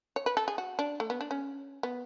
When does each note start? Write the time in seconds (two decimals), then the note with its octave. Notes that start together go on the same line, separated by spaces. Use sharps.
0.16 C#5
0.26 B4
0.37 A4
0.48 G#4
0.58 F#4
0.79 D4
1.00 A3
1.10 B3
1.21 D4
1.31 C#4
1.83 B3